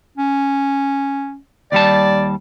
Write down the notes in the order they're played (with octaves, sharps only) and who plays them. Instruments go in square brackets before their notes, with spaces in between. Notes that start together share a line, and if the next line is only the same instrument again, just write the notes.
[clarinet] C#4
[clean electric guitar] D#2 G3 A5 [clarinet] D5